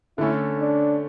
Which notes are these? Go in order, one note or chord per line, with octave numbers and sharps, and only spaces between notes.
D3 A3 C#4 E4
D4